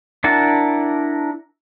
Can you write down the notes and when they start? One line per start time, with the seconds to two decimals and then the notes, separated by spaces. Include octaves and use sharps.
0.24 D4 E4 A#4 F#5 A5